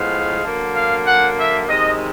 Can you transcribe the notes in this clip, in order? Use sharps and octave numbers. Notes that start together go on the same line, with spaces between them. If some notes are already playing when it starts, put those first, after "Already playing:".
Already playing: A2 F3 G#3 B3 F5
D3 F#3 A#3
F5
F#5
E5
C3 D#3 G#3 D#5